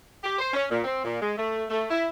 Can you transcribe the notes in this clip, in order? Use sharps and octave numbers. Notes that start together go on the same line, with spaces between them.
G4
C5
C#4
A#2
C4
A#2
G#3
A3
A3
E4